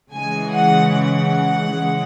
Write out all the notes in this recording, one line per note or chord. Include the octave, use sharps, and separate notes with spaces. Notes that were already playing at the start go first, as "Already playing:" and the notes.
C#3 E3 G#3 G#5
F#5
F#5
C#3 E3 G#3